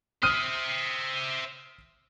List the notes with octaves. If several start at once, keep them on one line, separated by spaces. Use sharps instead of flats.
C5 E5 D#6 F6 D#7